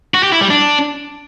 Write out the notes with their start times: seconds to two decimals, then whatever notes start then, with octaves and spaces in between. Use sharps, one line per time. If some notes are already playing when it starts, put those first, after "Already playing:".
0.14 F#4
0.23 G4
0.32 E4
0.41 G3
0.50 D4